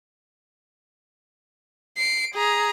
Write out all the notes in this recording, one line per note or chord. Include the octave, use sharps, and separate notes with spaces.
C7 D7
G#4 A#5